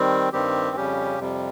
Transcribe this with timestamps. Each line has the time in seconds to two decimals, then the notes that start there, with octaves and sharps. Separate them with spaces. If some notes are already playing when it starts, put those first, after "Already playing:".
Already playing: D#3 G3 C4
0.33 G2 D#3 G3 C4 G4
0.76 F2 C#3 G3 C#4 G4
1.19 F2 C3 G3